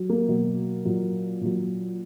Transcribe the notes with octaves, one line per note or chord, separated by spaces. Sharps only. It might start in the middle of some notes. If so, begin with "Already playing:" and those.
Already playing: F#3
A#3
B2 F#3
A#2 F#3
A#2 F#3